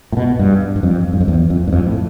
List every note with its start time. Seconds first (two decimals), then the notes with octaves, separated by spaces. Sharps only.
0.12 A2
0.17 B2
0.39 G2
0.76 G2
0.83 F2
1.13 G2
1.20 F2
1.28 E2
1.50 F2
1.68 G2
1.73 F2
1.87 A2